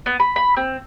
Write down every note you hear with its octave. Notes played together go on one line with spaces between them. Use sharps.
B3
B5
B5
C4